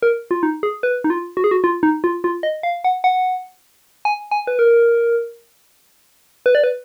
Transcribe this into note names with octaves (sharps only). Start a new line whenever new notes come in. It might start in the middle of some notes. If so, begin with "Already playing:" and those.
A#4
F4
D#4
G#4
B4
D#4
F4
F#4
G#4
F#4
F4
D#4
F4
F4
D#5
F5
F#5
F#5
G#5
G#5
B4
A#4
B4
D5
B4